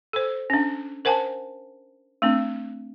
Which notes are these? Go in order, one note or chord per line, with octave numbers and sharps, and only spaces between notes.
A4 C5
C#4 D4
A#4 C5 F#5 G#5 A5
A3 C4 D4